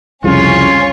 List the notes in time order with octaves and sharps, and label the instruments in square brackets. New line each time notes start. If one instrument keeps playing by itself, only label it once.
[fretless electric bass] C2 F2 C#3 [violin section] C#4 C#5 [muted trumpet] F4